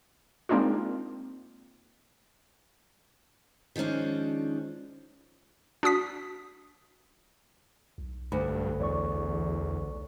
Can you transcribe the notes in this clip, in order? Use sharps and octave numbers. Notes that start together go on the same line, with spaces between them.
G#3 A#3 C4 D4 D#4 F4
D#3 F3 G#3 C#4 D4
D4 F#4 D#6 B6
B1
D2 G2 B5
E2 C#5 D5 C#6